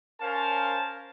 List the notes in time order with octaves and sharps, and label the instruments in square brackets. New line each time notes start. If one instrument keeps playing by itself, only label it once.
[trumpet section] C#4 A#4 C5 F5 A5